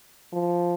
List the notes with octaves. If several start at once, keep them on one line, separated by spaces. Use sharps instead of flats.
F3